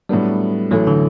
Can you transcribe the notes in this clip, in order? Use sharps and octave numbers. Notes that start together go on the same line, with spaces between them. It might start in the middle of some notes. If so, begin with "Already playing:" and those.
A2 F#3 G3 B3 D4
A1 A2 E3 F#3 A3
D3